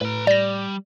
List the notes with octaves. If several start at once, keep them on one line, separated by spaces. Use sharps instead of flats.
A2 B4 A#5
G3 D5 A#6